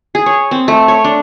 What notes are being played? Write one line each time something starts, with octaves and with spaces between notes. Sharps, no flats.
G#4
C#5
C4
A3
C#5
D4